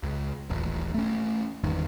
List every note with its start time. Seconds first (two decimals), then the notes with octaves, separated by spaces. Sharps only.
0.03 C#2
0.50 D#1 A1
0.94 A3 C#4
1.64 G1 E2 G2 D#3